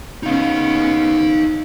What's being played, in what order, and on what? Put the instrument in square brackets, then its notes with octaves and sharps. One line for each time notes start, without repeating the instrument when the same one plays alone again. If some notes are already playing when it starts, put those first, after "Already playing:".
[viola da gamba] C#3 B3 C#4 [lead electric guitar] D#4 F5